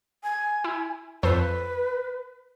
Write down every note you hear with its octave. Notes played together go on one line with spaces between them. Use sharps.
G#5
E4
F2 A4 B4 C5